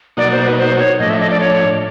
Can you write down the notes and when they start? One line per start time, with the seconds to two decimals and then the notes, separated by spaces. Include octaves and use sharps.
0.17 B2 F#3 A#3 D#4 F#4 D5
0.32 C5
0.45 B4
0.58 C5
0.78 C#5
0.99 A2 F3 A3 D4 D#5
1.10 E5
1.20 D#5
1.30 D5
1.40 C#5